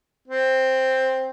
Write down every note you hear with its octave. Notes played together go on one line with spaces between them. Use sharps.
C4